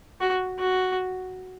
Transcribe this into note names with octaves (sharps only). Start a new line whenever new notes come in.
F#4
F#4